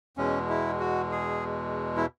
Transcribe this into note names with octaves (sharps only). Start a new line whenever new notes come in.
E2 B2 G#3 C#4
E4
F#4
G#4
E4